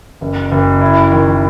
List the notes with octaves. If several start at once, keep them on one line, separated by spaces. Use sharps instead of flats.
F#1
F#1
E4
D#3